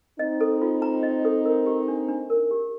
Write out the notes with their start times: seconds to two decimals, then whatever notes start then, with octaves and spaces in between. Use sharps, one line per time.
0.19 C4 D#4 D#5
0.41 A4
0.62 F4
0.82 A#5
1.03 D#5
1.25 A4
1.45 A#4
1.66 G4
1.88 D4
2.09 D4
2.30 A#4
2.51 G4